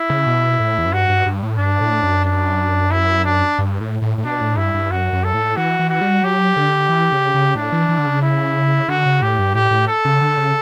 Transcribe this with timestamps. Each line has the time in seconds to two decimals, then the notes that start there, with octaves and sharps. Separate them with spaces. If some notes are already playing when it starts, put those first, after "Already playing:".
Already playing: E4
0.10 C#3
0.27 B2
0.60 A2
0.78 E2
0.86 F#2
0.93 G2 F#4
1.09 G2
1.26 G2
1.43 A2
1.58 G2 D4
1.81 A2
2.03 F#2
2.25 D4
2.91 E4
3.25 D4
3.58 G2
3.81 A2
4.02 A2
4.18 A2
4.24 B2 D4
4.41 A2
4.57 G2 E4
4.74 G2
4.90 F#2 F#4
5.13 F#2
5.24 A4
5.34 A2
5.56 E3 F#4
5.79 E3
5.90 F#4
6.01 G3
6.23 F#3 G4
6.57 D3
6.89 E3
7.12 C#3
7.34 C#3
7.55 A2 D4
7.72 E3
7.89 E3
7.98 D3
8.06 C#3
8.22 E4
8.88 D3 F#4
9.06 C#3
9.22 A2 G4
9.39 G2
9.54 A2 G4
9.71 A2
9.88 A4
10.05 C#3
10.21 D3
10.37 C#3